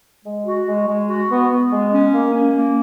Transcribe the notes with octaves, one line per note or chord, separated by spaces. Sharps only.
G#3
F#4
G#3
G#3
F#4
B3
B3
G#3
C#4
A#3
C#4
A#3